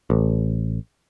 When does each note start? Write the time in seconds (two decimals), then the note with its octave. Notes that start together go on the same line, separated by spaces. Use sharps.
0.10 A1